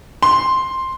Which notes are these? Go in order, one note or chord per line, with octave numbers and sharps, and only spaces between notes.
C6